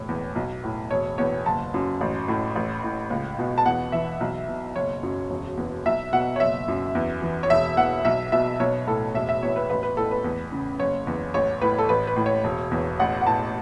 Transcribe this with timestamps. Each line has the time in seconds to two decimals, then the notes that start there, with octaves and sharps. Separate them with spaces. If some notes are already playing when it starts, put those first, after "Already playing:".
Already playing: E1 A2 C#5
0.09 E2
0.35 B1
0.64 A2
0.91 E1 C#5
1.18 E2 C#5
1.46 F#1 A5
1.74 F#2
2.01 A1
2.28 A2
2.56 A1
2.83 A2
3.10 C#2
3.39 B2
3.58 A5
3.66 E2 F#5
3.92 E3 E5
4.20 B1
4.48 B2
4.76 F#1 C#5
5.03 F#2
5.30 E1
5.57 E2
5.86 B1 E5
6.13 B2 F#5
6.36 C#5
6.40 F#1 E5
6.68 F#2
6.95 E2
7.22 E3
7.43 C#5
7.50 E1 E5
7.77 E2 F#5
8.05 B1 E5
8.32 B2 E5
8.59 B1 C#5
8.87 A2 A4
9.14 E1 E5
9.29 E5
9.43 E2 C#5
9.56 B4
9.70 A1 B4
9.83 B4
9.97 A2 A4
10.11 B4
10.24 E2
10.52 C#3
10.79 F#1 C#5
11.07 E2
11.34 A1 C#5
11.62 A2 B4
11.78 A4
11.89 A1 B4
12.07 B4
12.16 A2
12.26 C#5
12.44 E1
12.71 E2
12.99 A1 F#5
13.21 F#5
13.27 A2 A5